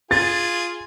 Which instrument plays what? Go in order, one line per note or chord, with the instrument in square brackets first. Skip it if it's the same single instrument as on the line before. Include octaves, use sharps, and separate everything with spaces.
[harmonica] F4 G#4 [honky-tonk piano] A6